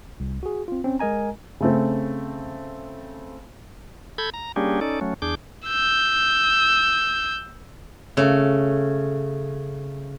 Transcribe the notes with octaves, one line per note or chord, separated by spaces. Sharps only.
C2
F#4 G#4
C4 F4
C4 C#4
G#3 A#4 D#5 G#5 A#5
C#3 A3 C4
A4 B5 G6 G#6
A#5
G3 A#3 C#4 D4 G4 G#4
C#4 D#4 A4 D5
F#3 A3 C#4
E2 D4 G#4 D6 G6
E6 G6
C#3 A3